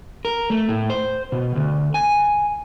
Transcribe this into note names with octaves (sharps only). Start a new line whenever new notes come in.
A#4
A3
A2
C5
B2
D2
G#5